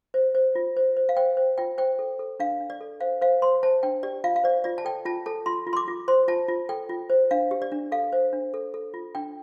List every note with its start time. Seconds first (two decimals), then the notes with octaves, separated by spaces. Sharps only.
0.14 C5
0.35 C5
0.55 F4
0.76 C5
0.97 C5
1.09 F5
1.17 C5 G5
1.37 C5
1.58 F4 G5
1.78 C5 G5
1.99 A4
2.19 A4
2.40 D4 F5
2.60 D4
2.70 D5
2.81 A4
3.00 C5 F5
3.21 C5 F5
3.42 C5 C6
3.63 C5 A5
3.83 D4 G5
4.03 G4 D5
4.24 F4 F5
4.36 F5
4.44 C5 D5
4.64 F4 D5
4.78 A5
4.85 A4 G5
5.05 F4 A5
5.26 A4 A5
5.46 F4 C6
5.67 F4
5.73 C6
5.77 D6
5.88 F4
6.08 C5 C6
6.28 F4 A5
6.48 F4
6.69 A4 G5
6.89 F4
7.10 C5
7.31 D4 F5
7.51 G4
7.62 D5
7.72 D4
7.92 A4 F5
8.13 C5
8.33 D4
8.54 A4
8.74 A4
8.94 F4
9.15 D4 G5